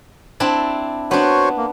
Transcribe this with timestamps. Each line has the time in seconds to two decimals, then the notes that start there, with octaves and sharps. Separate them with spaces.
0.40 C4 D4 E4
1.11 B3 D4 F#4 C5 C#5
1.58 A#3